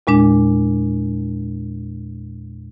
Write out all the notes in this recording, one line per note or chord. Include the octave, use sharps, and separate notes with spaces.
E2 A#2 G#3 D4